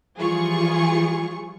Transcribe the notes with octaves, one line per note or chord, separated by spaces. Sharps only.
E3 F3 G3 F4 G#4 C#6